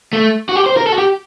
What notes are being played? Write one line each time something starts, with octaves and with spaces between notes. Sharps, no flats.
A3
F#4
G4
C5
A#4
A4
F#4
G4